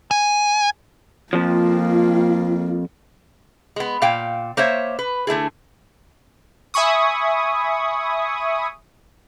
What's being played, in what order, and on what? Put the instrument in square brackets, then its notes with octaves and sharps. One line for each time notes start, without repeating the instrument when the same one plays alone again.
[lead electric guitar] G#5
[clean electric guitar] F2 F3 [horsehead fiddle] A#3 F4
[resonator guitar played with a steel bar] G#3 B3
A#2 F5 G5
A#3 C5 C#5 E5
B4
D3 A3 E4 G#4
[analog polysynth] E5 G#5 B5 C#6 D#6